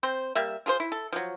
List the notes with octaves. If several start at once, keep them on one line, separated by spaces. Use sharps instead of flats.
C4 C5
G3 A#3 E5
F4 G#4 A4 C5
E4
A4
F3 F#3